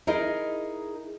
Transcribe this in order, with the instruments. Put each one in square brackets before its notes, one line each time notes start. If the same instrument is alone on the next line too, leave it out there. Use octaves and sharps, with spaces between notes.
[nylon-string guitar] D#4 E4 G#4 A#4 D#5